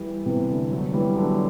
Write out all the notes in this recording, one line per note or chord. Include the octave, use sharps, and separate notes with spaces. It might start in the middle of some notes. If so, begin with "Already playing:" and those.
Already playing: E3 G3
C3 E3
D3
D3 F#3
E3 G3
D3 F#3